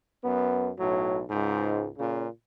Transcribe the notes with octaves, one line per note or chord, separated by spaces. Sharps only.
F#2 B3
B1 A2 F#3
C#2 G#2
A#2 C#3